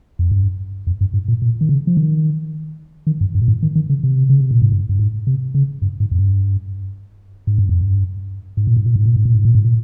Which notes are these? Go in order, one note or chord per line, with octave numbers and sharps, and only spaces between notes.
F2
G2
F2
G2
G#2
A#2
A#2
D#3
C#3
F3
D#3
D#3
G2
G2
A#2
G#2
D#3
D#3
C#3
C3
C#3
C3
A#2
G#2
G2
G2
G#2
C3
C#3
G2
G#2
F2
G2
G#2
G2
F2
G2
G#2
A#2
G#2
A#2
G#2
A#2
G#2
A#2
G#2
A#2
G#2
A#2